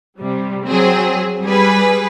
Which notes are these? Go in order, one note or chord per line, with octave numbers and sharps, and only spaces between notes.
C3 G3
F#3 C4 G#4
G3 G#4 B4